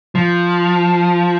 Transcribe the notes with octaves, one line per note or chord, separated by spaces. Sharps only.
F3